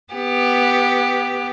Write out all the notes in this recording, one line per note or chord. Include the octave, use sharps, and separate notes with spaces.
B3 G4